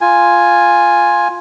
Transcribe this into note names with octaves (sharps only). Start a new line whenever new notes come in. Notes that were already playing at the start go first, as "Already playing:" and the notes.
F4 G#5